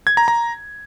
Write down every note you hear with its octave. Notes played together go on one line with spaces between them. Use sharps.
G#6
A#5
A#5